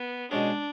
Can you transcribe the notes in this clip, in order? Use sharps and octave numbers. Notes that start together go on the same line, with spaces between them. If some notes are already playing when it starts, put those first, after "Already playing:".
Already playing: B3
B2 G#3 C#4 D4 G#4